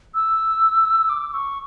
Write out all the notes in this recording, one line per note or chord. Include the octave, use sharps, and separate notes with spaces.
E6
D6
C#6